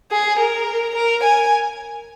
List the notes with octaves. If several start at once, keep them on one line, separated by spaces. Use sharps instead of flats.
G#4
A#4
A#4
G#5